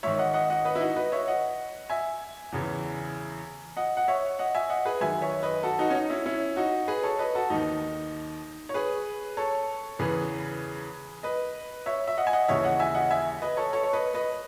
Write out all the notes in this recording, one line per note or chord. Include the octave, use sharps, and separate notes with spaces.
G#2 D#3 C#5 E5
D#5 F#5
D#5 F#5
D#5 F#5
B4 D#5
E4
D#4 F#4
B4 D#5
C#5 E5
D#5 F#5
E5 G#5
E2 C#3 E3
D#5 F#5
F#5
C#5 E5
D#5 F#5
E5 G#5
D#5 F#5
G#4 B4
F#2 D#3 E5 G#5
C#5 E5
B4 D#5
F#4 A4
D#4 F#4
C#4
D#4
C#4 E4
C#4 E4
D#4 F#4
G#4 B4
A4 C#5
B4 D#5
F#4 A4
D#2 D#3 D#4
C#5
G#4 B4
A4 C#5
E2 C#3 E3 G#4 B4
B4 D#5
C#5 E5
E5
D#5 F#5
G#5
D#5 F#5
D#2 C#3 E3 C#5 E5
D#5 F#5
E5 G#5
D#5 F#5
E5 G#5
B4 D#5
A4 C#5
A4 C#5
C#5
B4 D#5
B4 D#5